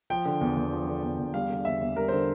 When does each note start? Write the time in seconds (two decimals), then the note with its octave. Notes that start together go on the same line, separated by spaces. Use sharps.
0.10 F3 G5
0.25 D3
0.41 E2
0.57 E2
0.73 F3
0.87 D3
1.03 E2
1.19 E2
1.34 G3 F5
1.50 D3
1.65 E2 E5
1.81 E2
1.96 G3 A#4
2.08 D3 C5